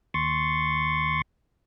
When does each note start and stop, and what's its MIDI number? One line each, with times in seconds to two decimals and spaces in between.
0.14 1.22 39
0.14 1.22 84
0.14 1.22 85
0.14 1.22 93